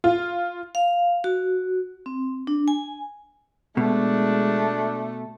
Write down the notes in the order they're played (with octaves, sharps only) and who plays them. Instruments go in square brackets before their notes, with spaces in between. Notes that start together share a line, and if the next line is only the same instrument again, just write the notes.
[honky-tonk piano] F4
[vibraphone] F5
F#4
C4
D4
G#5
[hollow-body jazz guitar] B2 [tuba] G#3 [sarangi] A3 [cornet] D4